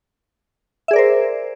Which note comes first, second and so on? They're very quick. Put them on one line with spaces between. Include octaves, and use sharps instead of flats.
E5 G#4 D5 A#4 C5